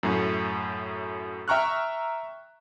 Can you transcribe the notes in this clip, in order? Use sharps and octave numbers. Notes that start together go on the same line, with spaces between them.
F#2 A2
E5 G5 A#5 C#6 F6 F#6